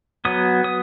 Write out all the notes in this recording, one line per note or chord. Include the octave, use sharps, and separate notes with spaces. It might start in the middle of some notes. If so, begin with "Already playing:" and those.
F#3 B3 D#6
D#6